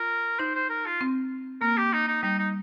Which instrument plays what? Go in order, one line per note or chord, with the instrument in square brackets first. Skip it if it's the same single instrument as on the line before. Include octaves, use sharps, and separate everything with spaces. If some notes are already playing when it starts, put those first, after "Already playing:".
Already playing: [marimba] F4 [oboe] A#4
[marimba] D#4 [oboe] C5
[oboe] C5
A#4
F4
[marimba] C4
[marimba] A#3 [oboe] A#4
[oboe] G4
D#4
D#4
[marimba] G3 [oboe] D#4
[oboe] D#4